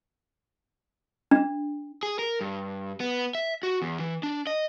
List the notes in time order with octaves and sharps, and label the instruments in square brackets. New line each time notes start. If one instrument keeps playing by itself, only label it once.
[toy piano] D4
[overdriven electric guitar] G#4
A#4
G2
B3
E5
F#4
E2
E3
D4
D#5